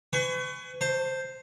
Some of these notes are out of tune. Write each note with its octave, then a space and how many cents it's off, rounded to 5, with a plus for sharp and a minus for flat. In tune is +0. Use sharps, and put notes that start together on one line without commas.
B4 +45 G#5 +0 C#6 +15
C5 +0 A5 +35